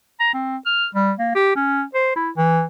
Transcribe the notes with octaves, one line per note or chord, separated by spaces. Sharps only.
A#5
C4
F6
G3
A#3
G4
C#4
C5
E4
E3